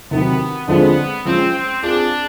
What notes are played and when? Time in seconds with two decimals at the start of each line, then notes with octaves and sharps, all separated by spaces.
0.11 C3 D#3 F#3 B3
0.68 D3 F3 G#3 B3 C4
1.25 F3 G#3 C4 C#4
1.53 C4
1.82 C4 D4 F4 G#4